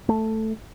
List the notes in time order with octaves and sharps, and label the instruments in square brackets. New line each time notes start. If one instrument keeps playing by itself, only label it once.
[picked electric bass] A3